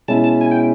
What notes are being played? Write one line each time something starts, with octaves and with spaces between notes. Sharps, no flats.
B2 G#3 C#4 E4 A5
A5
G#5
G5